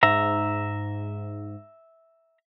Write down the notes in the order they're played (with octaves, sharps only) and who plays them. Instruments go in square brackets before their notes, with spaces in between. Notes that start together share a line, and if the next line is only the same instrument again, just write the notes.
[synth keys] G#2 [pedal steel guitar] E5 A#5